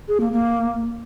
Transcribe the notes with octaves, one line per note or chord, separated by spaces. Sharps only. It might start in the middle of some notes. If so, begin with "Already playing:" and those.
G#4
A#3
A#3